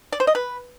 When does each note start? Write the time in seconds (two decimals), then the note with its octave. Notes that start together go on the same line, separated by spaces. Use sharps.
0.12 D5
0.20 C5
0.27 D#5
0.35 B4